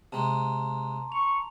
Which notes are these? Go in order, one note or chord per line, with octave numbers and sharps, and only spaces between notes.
C3 G#3 A5 A#5 C6
C#6 F7